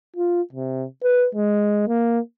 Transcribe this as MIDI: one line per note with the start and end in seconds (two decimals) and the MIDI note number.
0.17 0.42 65
0.53 0.85 48
1.04 1.27 71
1.35 1.84 56
1.88 2.19 58